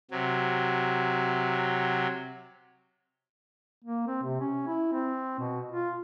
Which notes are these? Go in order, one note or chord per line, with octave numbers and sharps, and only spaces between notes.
C3 F#3
A#3
C4
C3
C#4
E4
C4
B2
F4